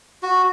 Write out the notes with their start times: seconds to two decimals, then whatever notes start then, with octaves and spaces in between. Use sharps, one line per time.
0.23 F#4